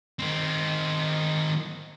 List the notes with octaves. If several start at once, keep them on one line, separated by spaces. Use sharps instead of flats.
D#3 C4